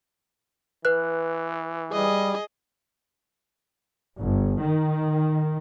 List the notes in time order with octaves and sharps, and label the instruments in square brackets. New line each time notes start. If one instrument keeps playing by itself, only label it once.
[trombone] E3 [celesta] B4 F#6
[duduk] G3 [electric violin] G#4 D#5
[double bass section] G1
D#3